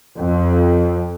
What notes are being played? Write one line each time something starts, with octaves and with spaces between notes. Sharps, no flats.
F2